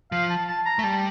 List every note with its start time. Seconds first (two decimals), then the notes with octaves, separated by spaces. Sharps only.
0.12 F3 F5
0.30 A5
0.48 A5
0.66 A#5
0.79 A3
0.83 G3 A5